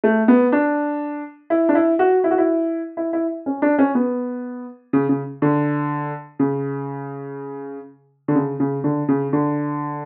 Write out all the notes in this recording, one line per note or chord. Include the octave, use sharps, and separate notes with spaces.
A3
B3
D4
E4
D4
E4
F#4
E4
F#4
E4
E4
E4
C#4
D4
C#4
B3
C#3
C#3
D3
C#3
D3
C#3
C#3
D3
C#3
D3